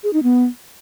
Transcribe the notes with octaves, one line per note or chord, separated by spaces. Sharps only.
G#4
D#4
B3